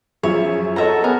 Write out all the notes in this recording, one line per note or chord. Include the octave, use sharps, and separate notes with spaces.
F#2 F3 G#4 C#5 E5
A4 C#5 D#5 E5 F#5 A#5
B3 A#4 G#5